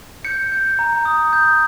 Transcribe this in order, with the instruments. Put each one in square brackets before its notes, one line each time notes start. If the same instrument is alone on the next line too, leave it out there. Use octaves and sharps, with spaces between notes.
[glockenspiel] G6 C#7
G6
A#5
D#6
G6